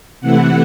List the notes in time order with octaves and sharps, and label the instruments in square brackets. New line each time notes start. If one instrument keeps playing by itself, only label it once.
[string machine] C3 E3 A3 E4 F#5